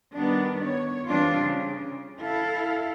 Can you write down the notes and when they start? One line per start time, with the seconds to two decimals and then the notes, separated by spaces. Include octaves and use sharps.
0.13 D#3 G3 B3 D4
0.65 C#5
1.07 E3 G3 C4 D4 F4
1.37 C#3
2.20 E4 A4 F5